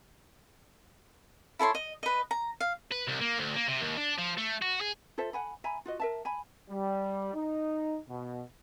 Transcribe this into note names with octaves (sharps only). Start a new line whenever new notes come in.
E4 A4 C#5 C6
D#5
B4 D#5
A#5
F5
B4
C2
A#3
D2
A#3
C3
D#2
D4
F3
A3
F#4
G#4
F4 A4 C5 E5
F#5 G#5 B5
E5 G#5 A#5 B5
F4 F#4 D#5
A#4 E5 A5
G#5 B5
G3
D#4
B2